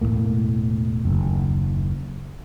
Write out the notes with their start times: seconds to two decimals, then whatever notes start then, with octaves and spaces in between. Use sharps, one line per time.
0.01 E1 F2 A2 A#3
1.05 F#1 D#2